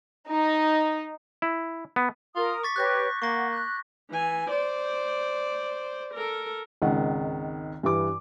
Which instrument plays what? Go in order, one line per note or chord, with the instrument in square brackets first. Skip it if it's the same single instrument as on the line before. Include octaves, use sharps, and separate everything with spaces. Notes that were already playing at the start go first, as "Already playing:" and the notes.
[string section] D#4
[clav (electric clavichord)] E4
B3
[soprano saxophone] F4 [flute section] A#4 D#6
[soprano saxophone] C#6 [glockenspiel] D6 A6 B6
[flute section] G4 B4 C#5 [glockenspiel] F#6 G6 A#6
[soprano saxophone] A#3 [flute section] F#5 [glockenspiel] C#6 A#6
[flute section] F#6
[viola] E3 G#5
C5 D5
A4 A#4
[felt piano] G#1 C#2 D#3 F#5
G2 E3 D6